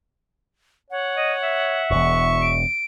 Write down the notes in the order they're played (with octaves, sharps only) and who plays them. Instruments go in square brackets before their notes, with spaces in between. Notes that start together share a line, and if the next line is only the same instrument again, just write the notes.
[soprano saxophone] C#5 [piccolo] F#5
[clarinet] D#5
E5
[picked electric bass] E1 E2 [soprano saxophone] C#6
[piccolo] D7